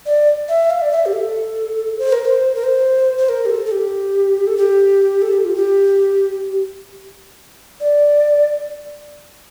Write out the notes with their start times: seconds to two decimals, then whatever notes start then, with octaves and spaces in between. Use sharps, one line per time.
0.06 D5
0.48 E5
0.70 F5
0.82 D5
0.91 E5
1.06 G4
1.13 A4
1.99 C5
2.12 A#4
2.25 C5
2.55 A#4
2.64 C5
3.18 C5
3.29 A#4
3.46 G4
3.49 A4
3.66 A4
3.71 G4
4.47 A4
4.58 G4
5.22 A4
5.33 G4
5.44 F4
5.55 G4
7.80 D5